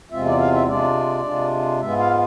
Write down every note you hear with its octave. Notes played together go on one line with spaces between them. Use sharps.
E2 C3 G#3 C4 F4 E5
D5
F5
E5
C3 G#3 D4 F4 D5
C3 G#3 D4 F4
G#2 G#3 B3 F4 E5
F5